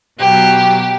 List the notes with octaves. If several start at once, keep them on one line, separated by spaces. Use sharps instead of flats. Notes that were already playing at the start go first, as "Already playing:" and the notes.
B2 F#3 G4